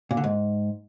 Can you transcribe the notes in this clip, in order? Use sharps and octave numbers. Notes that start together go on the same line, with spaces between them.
A#2
D3
G#2